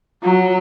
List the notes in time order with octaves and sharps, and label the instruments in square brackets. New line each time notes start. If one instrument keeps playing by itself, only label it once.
[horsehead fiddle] F#3